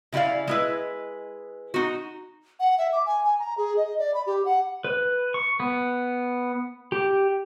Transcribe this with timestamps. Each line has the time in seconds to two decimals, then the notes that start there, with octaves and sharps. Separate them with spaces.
0.12 C#3 E4 F4 D5 F5
0.47 G#3 E4 B4
1.74 D#4 F#4
2.60 F#5
2.78 E5
2.93 D6
3.06 G#5
3.24 G#5
3.39 A#5
3.58 G#4
3.77 D#5
3.99 D5
4.14 B5
4.27 G4
4.45 F#5
4.84 B4
5.34 C#6
5.60 B3
6.92 G4